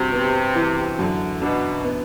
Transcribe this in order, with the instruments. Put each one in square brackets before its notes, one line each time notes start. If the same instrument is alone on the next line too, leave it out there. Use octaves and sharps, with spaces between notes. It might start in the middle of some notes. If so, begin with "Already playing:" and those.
Already playing: [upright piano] G2 F#4 [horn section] C3
[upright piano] B3
E3
[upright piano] F#2 [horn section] D3
[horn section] B2 [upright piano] D4
[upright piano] B3